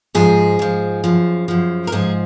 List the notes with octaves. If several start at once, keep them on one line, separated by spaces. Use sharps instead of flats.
G#2 F3 G#4
G#2 F3
F#2 F3
F#2 F3
A#4
G#2 F3 G#4